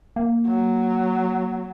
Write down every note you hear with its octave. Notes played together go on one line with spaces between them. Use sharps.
A#3
F#3